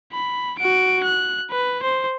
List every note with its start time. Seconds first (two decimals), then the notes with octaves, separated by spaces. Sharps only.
0.12 B5
0.59 F#4 D7
1.03 F#6
1.51 B4
1.82 C5